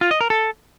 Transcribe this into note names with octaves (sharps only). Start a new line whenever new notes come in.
F4
D#5
A#4
A4